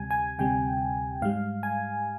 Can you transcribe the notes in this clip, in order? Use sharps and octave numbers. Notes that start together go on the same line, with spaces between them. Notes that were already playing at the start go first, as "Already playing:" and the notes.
Already playing: D2 C3 G3 G#5
G#5
D2 C3 G3 G5
G#2 G3 F5
G#5